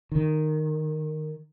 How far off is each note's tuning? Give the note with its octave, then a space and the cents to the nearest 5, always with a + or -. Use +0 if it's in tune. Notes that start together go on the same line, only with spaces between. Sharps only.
D#3 -10